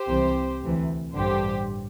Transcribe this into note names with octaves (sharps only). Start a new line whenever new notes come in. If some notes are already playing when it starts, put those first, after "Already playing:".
Already playing: G4 C5
C2 C3 E3
D2 C3 E3
A1 G2 D3 G4 C5